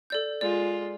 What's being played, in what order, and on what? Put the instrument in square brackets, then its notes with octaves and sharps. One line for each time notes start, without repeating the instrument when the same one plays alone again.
[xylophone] A4 D5 G6
[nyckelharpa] G#3 F4 [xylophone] D5